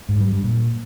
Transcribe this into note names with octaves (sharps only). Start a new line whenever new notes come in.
G#2
G3
G2
A#2